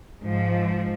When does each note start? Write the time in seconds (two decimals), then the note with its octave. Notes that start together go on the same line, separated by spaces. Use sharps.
0.22 G#2 F3